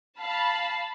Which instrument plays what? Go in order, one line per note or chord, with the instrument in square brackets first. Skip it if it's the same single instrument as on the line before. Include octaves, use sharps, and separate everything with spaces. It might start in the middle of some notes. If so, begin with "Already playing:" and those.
[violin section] F5 A5 B5